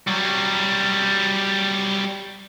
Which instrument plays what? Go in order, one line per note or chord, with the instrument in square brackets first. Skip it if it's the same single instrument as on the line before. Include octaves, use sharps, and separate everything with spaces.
[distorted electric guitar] F#3 G3